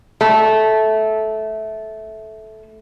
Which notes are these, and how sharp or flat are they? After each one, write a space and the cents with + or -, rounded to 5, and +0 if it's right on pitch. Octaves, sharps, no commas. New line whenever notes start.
A3 -15